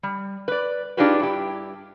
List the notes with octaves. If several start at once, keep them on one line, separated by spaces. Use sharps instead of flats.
G3
B4 D5
D4 D#4 F4 G4 G#4 B4
G2 E4 G4